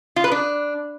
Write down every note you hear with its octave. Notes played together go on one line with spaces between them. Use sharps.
F4
B4
D4